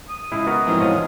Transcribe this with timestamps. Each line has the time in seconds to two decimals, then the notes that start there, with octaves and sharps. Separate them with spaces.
0.09 D#6
0.32 C#2 E4
0.47 B3 F#4 A#4
0.66 F2 G#2 E3
0.79 F3 C#5 D#5